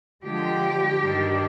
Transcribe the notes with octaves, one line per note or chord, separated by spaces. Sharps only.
D3 F3 G#3 G4
G2 D#3 G3 D4